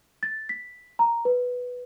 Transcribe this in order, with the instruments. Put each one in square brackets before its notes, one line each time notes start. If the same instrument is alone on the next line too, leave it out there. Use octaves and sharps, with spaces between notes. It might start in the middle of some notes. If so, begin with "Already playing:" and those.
[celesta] A6
B6
A#5
B4